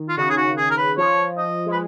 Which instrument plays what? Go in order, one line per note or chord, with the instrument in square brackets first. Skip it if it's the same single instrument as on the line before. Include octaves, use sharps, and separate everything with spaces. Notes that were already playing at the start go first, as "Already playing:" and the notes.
Already playing: [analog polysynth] D#3
[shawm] F4
[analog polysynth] C#3 [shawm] F#4
[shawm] G#4
F#4
G#4
A#4
B4
[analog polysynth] F3 [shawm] C#5
[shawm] D#5
[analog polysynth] G#3
[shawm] B4